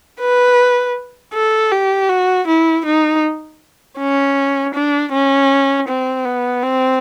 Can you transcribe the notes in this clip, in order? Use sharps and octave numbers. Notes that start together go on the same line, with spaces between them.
B4
A4
G4
F#4
E4
D#4
C#4
D4
C#4
C4
B3
C4